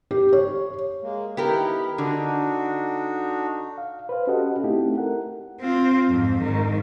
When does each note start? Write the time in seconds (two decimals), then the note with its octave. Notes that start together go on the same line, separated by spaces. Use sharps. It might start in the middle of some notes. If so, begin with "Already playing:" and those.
0.11 G4
0.33 C#5
1.02 G#3 A#3
1.37 D#3 B3 E4 G4 A#4
1.98 D3 D4 D#4 F#4
3.78 F5
4.09 B4 C5 F5
4.27 C#4 F#4 G4 A4 D#5 F#5
4.64 A3 C4 D#4 E4 G4 A4
4.98 A#4 F#5
5.61 C4 F4
6.07 F2 G#2
6.41 G#2 D#3